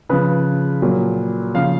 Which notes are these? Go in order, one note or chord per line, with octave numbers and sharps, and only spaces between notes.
C#3 F3 B4
A#2 F#3
C#3 F3 F5